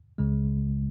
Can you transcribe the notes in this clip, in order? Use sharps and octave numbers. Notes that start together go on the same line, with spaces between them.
C#2 C#3 G#3